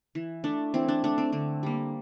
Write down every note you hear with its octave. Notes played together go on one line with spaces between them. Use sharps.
E3
A3 D4
E3 C4
D4
A3 D4
C4
D3 C4
G3 A#3